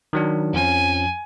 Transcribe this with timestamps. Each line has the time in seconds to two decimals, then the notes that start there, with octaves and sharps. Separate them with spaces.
0.13 D#3 F#3 D4
0.54 F2 F3 C#4 G#5